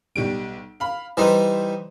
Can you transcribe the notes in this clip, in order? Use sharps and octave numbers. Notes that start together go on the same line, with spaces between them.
B1 G3 D7
F5 B5
E3 G3 D#4 B4 C5